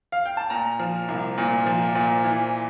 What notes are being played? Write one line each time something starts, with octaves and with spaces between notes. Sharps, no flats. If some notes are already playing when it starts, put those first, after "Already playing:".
F5
G5
A5
A#2 A#5
F3
C2
A#2
F3
A#2
E3